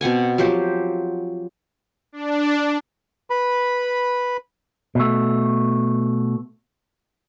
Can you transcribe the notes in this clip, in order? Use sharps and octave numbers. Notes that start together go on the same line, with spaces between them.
B2 C4 F#5 G#5
F3 F#3 G4 C5
D4
B4 B5
B2 A3